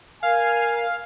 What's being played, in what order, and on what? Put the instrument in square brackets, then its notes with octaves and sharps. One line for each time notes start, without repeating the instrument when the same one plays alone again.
[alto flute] A#4 [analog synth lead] F5 [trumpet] G#5